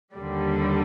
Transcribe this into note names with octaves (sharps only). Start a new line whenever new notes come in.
D#2 D3 G3